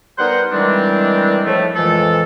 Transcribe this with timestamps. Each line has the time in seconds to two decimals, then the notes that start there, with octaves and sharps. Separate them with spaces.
0.18 G3 B3 D#4 A#4 C5 F#5
0.51 D#3 E3 G3 G#3 C4 D4
1.45 A2 F3 A3
1.75 F2 A#2 E3 G#3 A4